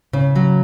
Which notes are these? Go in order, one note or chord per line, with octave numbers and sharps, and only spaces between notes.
C#3
F#3